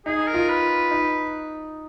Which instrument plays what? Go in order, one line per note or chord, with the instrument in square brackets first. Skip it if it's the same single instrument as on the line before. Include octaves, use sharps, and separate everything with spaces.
[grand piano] D#4 [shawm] G#4
[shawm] A#4
[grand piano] F4
[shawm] B4
[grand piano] D#4